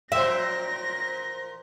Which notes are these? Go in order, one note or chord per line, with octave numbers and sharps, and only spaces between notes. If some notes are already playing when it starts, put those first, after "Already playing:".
A#2 F3 C5 E5 A#6